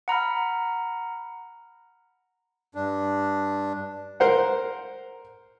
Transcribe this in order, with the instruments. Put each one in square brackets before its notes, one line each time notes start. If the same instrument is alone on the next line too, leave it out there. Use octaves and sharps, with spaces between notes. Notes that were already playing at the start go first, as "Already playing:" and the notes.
[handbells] F#5 A#5 B5 F6
[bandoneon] G2 D4
[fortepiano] A#4 C5 F#5